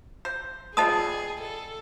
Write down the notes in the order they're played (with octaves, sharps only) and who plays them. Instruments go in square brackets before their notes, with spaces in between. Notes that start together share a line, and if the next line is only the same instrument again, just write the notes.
[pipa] C5
[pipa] D3 F3 G3 [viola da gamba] G#4 [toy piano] D#5 A5 D#6
[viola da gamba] A4